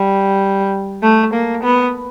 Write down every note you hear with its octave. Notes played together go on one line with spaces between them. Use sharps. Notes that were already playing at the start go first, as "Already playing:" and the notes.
Already playing: G3
A3
A#3
B3